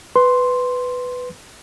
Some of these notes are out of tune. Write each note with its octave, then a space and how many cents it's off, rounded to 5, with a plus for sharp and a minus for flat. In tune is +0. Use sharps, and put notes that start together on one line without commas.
B4 +10 C6 +0